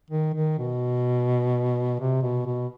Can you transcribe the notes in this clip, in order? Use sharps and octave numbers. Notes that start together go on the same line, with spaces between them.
D#3
D#3
B2
C3
B2
B2